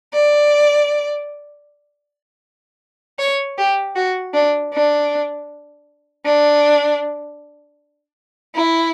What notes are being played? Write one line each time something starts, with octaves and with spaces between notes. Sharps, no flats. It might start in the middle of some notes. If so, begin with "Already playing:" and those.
D5
C#5
G4
F#4
D4
D4
D4
E4